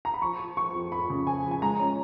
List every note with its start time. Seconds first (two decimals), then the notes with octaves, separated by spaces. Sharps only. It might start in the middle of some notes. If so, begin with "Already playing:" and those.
0.05 A#5
0.14 B5
0.22 F3 C#6
0.39 F3
0.57 F3 C#6
0.75 F2
0.92 F2 B5
1.10 C#3
1.26 F3 G#5
1.45 F3
1.51 G#5
1.62 G#3 A#5
1.80 C#4